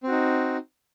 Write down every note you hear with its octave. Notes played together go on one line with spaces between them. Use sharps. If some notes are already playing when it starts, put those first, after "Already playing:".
C4 D#4 F#4